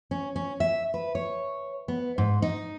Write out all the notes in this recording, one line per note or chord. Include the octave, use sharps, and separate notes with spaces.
C#4
C#4
E5
B4
C#5
B3
G#2
D#4